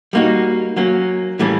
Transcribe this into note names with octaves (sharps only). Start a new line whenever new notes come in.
G3 A#3 D#4 F#4
F#3 A#3 C#4
A2 E3 G3 A#3 C#4